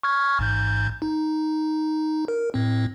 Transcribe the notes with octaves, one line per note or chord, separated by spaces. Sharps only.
C#6 F6 G#6
A1 G#2 G6
D#4
A#4
A2 C4